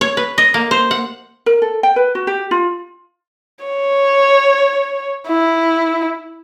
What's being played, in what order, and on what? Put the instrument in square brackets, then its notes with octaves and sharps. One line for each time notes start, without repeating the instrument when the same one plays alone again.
[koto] C#5
B4
D#5
A#3
C5
F#5
[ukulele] A#4
A4
G5
B4
F#4
G4
F4
[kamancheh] C#5
E4